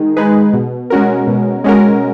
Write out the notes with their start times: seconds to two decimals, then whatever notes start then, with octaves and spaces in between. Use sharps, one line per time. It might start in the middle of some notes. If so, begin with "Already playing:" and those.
Already playing: D#3 G#3 D#4 G#4
0.17 G#3 D#4 G#4 B4
0.53 B2
0.90 G#3 C#4 F#4 A#4
1.27 B2
1.64 G#3 C#4 F#4 A#4